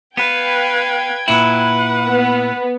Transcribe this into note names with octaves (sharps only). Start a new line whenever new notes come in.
B3 B4 F5 G5 G#6
A#2 E4 B4 F#5
B3